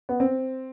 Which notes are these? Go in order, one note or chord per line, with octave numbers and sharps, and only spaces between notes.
B3
C4